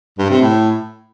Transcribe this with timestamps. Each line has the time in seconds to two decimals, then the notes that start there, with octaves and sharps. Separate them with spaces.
0.18 G2
0.30 C3
0.41 A2